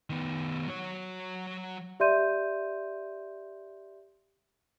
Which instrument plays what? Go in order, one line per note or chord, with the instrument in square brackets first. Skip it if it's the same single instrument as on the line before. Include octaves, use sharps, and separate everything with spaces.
[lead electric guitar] D#3 B3
F#3 C#5
[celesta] G4 D5 E5 C6 G6 D#7